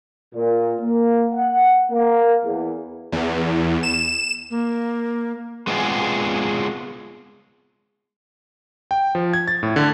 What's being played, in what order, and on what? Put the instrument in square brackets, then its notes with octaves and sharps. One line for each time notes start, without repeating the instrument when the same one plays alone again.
[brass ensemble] A#2
A#3
F#5
A#3
E2
[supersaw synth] E2
E7
[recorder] A#3
[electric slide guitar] G#3 B3 C4 D4 F4 G#4
[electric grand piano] G5
F3
G#6
A6
A2
D3